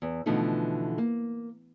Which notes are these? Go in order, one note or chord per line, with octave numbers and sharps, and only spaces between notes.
E2
B2 D3 E3 F3 A3 D#4
A#3